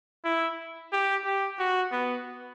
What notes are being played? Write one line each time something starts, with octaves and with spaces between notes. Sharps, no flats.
E4
G4
G4
F#4
B3